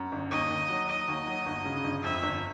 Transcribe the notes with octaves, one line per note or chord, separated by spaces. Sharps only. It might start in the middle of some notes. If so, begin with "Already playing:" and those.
Already playing: F#2
G1
D#2 D#5
D#2
F#3
F#3 D#5
D#2
F#3
G1
C#3
G1
F2 E5
G1